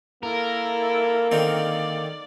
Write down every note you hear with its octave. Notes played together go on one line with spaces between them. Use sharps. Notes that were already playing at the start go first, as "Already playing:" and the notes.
A#3 E4 A4 A#4
D3 D#3 C4 D5